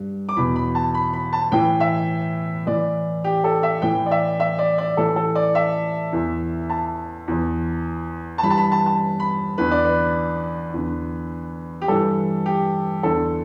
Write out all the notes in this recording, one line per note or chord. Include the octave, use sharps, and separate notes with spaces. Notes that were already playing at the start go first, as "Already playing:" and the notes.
Already playing: G2
D6
E2 B2 B5
B5
A5
B5
B5
A5
A2 E3 G5
E5
A2 E3 D5
G4
A4
E5
A2 E3 G5
D5
E5
E5
D5
D5
A2 E3 A4
A4
D5
E5
E2 E3
A5
E2 E3
A5
G2 E3 B5
A5
B5
A5
A5
B5
E2 D3 B4
D5
B4
E2 D3
G4
G2 E3 A4
G4
E2 D3 A4